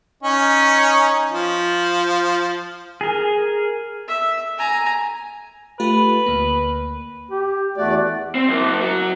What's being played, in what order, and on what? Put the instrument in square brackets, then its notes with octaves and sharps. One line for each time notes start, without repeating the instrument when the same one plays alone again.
[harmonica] C#4 D#4
F3
[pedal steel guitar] G#4 A#4
[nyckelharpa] E5
G#5 A#5
[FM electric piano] A3 F4 G4 [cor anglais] B4
[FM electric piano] D2 A#3
[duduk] G4
[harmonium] E2 A3 D5 [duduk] F#4
[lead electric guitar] C4
F#2 A#3
F#3